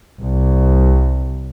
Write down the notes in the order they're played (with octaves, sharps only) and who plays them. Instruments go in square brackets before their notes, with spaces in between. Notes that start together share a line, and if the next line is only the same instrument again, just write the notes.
[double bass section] C2